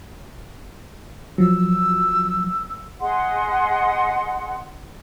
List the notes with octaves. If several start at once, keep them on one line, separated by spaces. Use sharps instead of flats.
F3 F#3 E6
G#4 D#5 F#5 C6